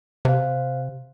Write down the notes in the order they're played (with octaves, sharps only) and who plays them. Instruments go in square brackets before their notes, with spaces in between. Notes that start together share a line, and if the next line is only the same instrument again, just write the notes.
[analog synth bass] C3 [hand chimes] C5 F5